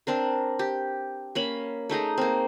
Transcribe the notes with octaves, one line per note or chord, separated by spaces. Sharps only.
C4 D4 A#4
G4
A#3 C#4 B5
A3 D#4 G#4 A#5
A#3 C4